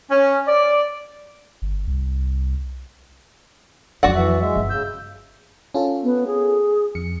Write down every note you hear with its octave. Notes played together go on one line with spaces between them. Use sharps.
C#4
D5
G1
C2
F2 F#3 F#4 D5 F#5
E3 E5
G#3 E5
G1
C#3 E6 G6
C#4 F4 A4
B3
G#4
F2 C#7